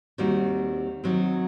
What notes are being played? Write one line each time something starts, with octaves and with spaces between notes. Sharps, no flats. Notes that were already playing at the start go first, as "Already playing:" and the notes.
D#2 D#3 G3 C4 F#4
D#3 F#3 C4 F#4